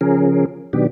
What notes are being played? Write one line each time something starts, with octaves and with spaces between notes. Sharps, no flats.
C#3 F3 C#4 G#4 A#4
B2 D#3 F#3 B3 D4 G4